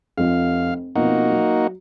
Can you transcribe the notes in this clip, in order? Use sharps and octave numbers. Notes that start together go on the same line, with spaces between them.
F1 F2 F4 F5
B2 F3 A#3 C4 D#4 F#4
F#3